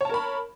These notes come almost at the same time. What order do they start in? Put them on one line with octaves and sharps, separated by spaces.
C#5 A5 A#4 B5